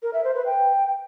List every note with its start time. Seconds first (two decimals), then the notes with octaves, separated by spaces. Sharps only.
0.03 A#4
0.14 E5
0.24 C5
0.35 B4
0.46 G5